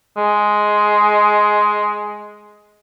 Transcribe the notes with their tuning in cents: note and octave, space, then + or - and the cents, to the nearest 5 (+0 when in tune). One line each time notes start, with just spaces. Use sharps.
G#3 +10